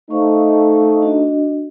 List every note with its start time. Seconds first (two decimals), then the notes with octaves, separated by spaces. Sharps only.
0.10 A3 D#4 C5 F5 C#6
1.02 D4 F#4 D#5